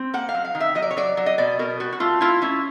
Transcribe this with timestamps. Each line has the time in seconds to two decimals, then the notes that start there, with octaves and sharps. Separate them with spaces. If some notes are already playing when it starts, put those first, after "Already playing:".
Already playing: C4
0.14 A#3 F#5
0.29 F5
0.34 F#3
0.45 F5
0.55 D#3
0.60 E5
0.75 F#3 D#5
0.82 D5
0.91 C#5
0.97 F#3 D5
1.17 F#3
1.26 D#5
1.38 B2 D5
1.59 B2 A#4
1.80 G3 F#4
1.92 F#4
2.00 A3 F4
2.21 E4 F4
2.42 C#4 E4